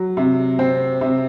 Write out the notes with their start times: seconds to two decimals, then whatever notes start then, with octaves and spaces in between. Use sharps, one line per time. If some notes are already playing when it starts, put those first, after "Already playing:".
Already playing: F#3
0.17 C3
0.59 C4
1.01 C3